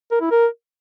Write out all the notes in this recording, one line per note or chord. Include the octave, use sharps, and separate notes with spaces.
A#4
E4
A#4